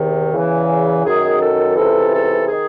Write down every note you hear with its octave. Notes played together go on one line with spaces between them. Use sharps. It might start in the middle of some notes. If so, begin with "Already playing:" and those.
Already playing: E2 C3 D#3
E2 C#3 E3
F#2 D#3 G#4
A4
C#2 C3 E3 A4
A4
D#3 G#4